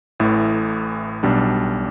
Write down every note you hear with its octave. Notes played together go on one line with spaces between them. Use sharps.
A1 A2 E3 A3
B1 B2 G3 D4